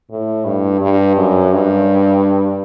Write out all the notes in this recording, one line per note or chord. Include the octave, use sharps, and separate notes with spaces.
A2
G2
G2
F#2
G2